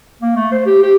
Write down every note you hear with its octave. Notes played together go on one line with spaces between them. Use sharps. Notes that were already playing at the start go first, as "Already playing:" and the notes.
A#3
A3
C5
G4
G4